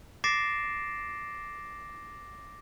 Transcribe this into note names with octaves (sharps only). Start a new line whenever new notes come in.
D6 A6 A#6 C7 D7 E7